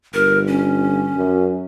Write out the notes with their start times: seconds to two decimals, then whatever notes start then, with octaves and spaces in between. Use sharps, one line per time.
0.14 G1 A#4
0.47 C#4
1.16 F#2